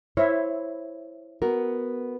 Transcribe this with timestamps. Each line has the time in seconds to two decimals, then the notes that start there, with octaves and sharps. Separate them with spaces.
0.17 E4 C5 C#5 E5
1.42 B3 F#4 A#4